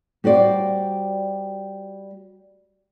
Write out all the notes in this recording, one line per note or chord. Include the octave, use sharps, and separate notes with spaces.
G3 F#4 C5 D5